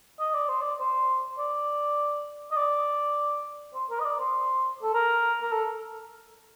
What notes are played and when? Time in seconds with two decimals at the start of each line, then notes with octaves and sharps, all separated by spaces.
0.20 D#5
0.34 D5
0.48 C5
0.61 D5
0.79 C5
1.38 D5
2.51 D#5
2.57 D5
3.75 C5
3.90 A#4
4.00 D#5
4.05 D5
4.20 C5
4.82 A4
4.94 A#4
5.42 A#4
5.52 A4